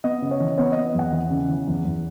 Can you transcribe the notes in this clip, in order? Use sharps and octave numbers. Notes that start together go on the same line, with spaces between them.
B3 D#5
C#3
C#5
E3
B3 C#5
D#5
B3
D#5
E2 F#5
E3
C#3
E3
E2
E2